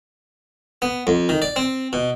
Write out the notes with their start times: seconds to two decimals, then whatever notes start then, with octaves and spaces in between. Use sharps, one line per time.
0.82 B3
1.07 F2
1.29 D#3
1.42 D5
1.56 C4
1.93 B2